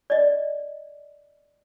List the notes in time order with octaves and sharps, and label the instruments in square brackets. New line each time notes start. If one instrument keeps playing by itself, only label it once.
[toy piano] D5 D#5